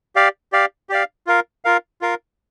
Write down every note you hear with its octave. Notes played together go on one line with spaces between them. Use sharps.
G4 D5 F5
G4 D5 F5
G4 D5 F5
F4 A#4 F5
F4 A#4 F5
F4 A#4 F5